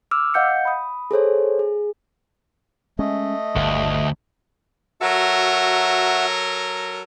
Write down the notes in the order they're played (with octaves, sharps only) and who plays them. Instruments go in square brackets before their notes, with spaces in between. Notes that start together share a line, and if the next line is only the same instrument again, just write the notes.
[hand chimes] D6 E6 F6
D#5 F5 F#5 G6 C#7
B5 D#6
G#4 A4 C5 C#5
G#4
[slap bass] G#3 C#4 [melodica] A3 D#5
[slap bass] G1 [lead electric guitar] D2
[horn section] F#3 A4 A#4 [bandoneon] F#4 E5